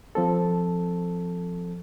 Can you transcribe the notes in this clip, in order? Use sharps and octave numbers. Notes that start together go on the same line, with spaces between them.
F3 C4 A4